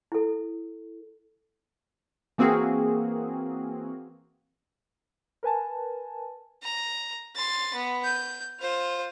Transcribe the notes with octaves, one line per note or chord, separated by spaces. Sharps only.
E4 A4
E3 A#3 C4 F#4 G#4 A#4
A#4 B4 G#5 A5
A#5
C6 A6
B3
G6
F4 C5